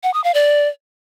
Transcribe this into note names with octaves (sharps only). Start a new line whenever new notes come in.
F#5
D#6
F5
D5